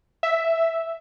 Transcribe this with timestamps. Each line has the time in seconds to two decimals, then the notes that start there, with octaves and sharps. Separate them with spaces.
0.23 E5